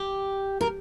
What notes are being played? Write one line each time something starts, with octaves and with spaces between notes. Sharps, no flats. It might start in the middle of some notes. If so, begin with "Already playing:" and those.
Already playing: G4
A#4